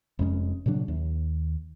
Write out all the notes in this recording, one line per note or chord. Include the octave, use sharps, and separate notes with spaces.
F1 F2 G#3 C#4
A#2 C#3 F#3 D4
D#2